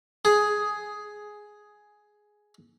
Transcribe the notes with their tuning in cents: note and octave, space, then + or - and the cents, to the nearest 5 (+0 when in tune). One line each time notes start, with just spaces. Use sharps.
G#4 +5